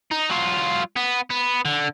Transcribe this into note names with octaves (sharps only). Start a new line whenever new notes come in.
D#4
F#3 F4
B3
B3
D3